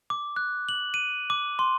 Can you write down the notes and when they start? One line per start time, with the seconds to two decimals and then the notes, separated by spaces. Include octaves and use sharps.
0.10 D6
0.36 F#6
0.69 F#7
0.94 D#7
1.30 D6
1.59 C6